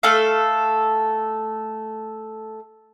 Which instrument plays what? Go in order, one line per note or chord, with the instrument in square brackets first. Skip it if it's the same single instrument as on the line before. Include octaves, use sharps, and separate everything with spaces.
[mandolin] A3 A4 F5